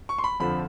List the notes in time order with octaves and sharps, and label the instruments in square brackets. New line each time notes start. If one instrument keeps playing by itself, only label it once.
[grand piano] C#6
C6
B5
F2 D3 F3 B5